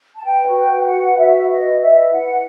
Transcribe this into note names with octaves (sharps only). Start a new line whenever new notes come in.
A5
B4 G5
F#4
G5
B4
G5
F#5
B4
F#4 E5
B4
D#5
B4
E5
B4
E4 F#5